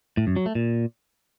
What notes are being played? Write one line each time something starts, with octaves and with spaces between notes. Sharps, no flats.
A2
F#2
F#3
A3
A#2